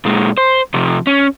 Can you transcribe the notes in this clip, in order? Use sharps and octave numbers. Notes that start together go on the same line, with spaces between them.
A#2 G#3
C5
C3 F3
C#4